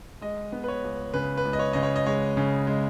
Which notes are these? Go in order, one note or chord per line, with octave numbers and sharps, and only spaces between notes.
G#3 D#5
B3
B4
C#5
C#2
C#3 B4
B4
C#2
D#5
C#5
C#3 D#5
C#5
D#5
G#3 C#5
C#3
G#3